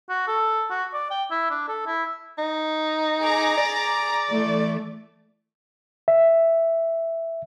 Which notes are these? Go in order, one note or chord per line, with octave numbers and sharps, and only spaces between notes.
F#4
A4
F#4
D5
G5
E4
D4
A4
E4
D#4
G#4 A#5 D6
D5
E3 A3
E5